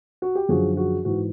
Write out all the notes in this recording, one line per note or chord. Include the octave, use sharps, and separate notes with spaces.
F#4
G4
F#2 D3 F3 F#4 G#4
F#4 G#4
G#2 E3 F#4